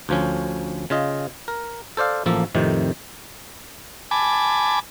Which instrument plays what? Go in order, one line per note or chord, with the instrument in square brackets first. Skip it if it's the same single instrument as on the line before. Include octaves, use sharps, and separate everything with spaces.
[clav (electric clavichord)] D2 F3 C#4
C#3 F4 D#5
A#4
A4 C5 D5 F5
A1 F3 A#3 A4
F2 A2 C3 D#3
[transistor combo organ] G#5 A5 B5 D6